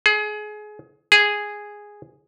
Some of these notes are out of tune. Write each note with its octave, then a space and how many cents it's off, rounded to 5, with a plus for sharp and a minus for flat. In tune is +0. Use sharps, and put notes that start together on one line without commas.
G#4 +25
G#4 -5